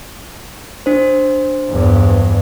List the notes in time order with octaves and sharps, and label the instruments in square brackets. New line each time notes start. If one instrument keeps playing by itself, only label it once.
[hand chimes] D4 C5
[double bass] E2 G2